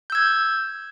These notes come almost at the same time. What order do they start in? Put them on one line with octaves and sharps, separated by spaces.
G6 E6 G#6